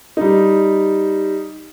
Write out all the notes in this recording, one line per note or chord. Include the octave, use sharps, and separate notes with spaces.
G3 D#4